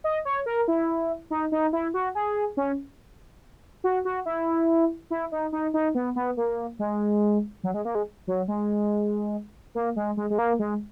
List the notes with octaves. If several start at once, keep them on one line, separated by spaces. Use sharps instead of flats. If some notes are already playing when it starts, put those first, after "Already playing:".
D#5
C#5
A#4
E4
D#4
D#4
E4
F#4
G#4
C#4
F#4
F#4
E4
E4
D#4
D#4
D#4
B3
B3
A#3
G#3
F#3
G#3
A#3
G#3
F#3
G#3
A#3
G#3
G#3
G#3
A#3
G#3